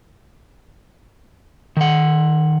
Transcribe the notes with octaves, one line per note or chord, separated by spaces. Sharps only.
D#3 F#5